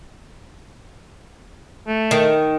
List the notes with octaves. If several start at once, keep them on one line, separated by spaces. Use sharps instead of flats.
A3
D#3